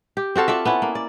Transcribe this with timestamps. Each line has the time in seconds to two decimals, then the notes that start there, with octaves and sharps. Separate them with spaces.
0.17 G4
0.35 C4 F#4 A4 F5
0.48 F4 A4 D5 E5
0.65 B3 C#4 E4
0.82 A#3
0.95 D5